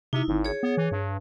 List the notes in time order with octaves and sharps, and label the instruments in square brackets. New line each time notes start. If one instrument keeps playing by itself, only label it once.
[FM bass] C3 [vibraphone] D#4 E4
[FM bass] G#1
[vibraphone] G#4 C#5
[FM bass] B3
E3
G2